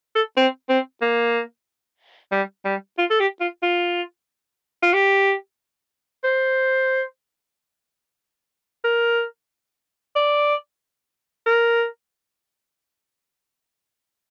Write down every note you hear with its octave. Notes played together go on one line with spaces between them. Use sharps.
A4
C4
C4
A#3
G3
G3
F4
A4
G4
F4
F4
F4
G4
C5
A#4
D5
A#4